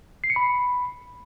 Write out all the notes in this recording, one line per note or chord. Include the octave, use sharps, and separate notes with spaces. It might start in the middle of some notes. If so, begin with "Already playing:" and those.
C7
C#7
B5